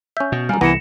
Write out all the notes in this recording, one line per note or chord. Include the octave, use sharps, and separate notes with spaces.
C#4 E5 G6
B2
F#2 G3 F5 G#5 A#5
C2 E3 B3 A#6 C#7 E7